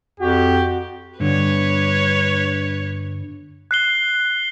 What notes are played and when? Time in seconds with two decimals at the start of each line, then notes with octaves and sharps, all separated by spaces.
0.20 F2 F#4 G4
1.20 G2 D3 B4 C#5
3.71 F#6 C7 G7